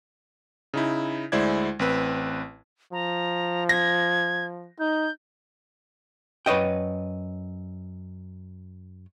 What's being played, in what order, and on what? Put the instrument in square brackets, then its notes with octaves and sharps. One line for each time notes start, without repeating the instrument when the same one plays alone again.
[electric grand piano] C#3 D#4 E4
D2 G#3 E4 C5 D5 G#6
A1 C4 B4
[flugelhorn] F3 [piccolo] A#5
[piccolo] G#6 [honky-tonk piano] A#6
[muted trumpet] D#4 [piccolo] G6
[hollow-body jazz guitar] F#2 B4 C#5 D#5 G5